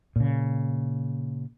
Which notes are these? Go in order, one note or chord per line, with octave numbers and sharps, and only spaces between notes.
A#2 C#3